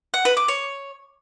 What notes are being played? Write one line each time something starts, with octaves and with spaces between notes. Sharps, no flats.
F#5
B4
D6
C#5